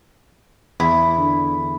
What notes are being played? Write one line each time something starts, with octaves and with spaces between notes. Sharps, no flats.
E2 E4
D3